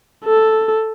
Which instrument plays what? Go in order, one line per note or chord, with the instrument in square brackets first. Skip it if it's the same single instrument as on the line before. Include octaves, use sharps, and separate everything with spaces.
[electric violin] A4